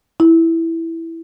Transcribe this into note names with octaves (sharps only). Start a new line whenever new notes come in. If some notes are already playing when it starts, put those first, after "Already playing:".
E4